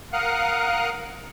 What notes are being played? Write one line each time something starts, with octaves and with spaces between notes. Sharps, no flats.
A#4 F5 F#5 D#6 F6 F#6